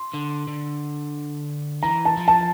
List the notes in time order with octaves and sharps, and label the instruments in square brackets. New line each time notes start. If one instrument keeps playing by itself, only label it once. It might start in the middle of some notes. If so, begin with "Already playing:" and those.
Already playing: [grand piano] C6
[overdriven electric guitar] D3
D3
[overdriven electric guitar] E3 [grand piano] A#5
[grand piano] A5
[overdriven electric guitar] F3
[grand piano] A5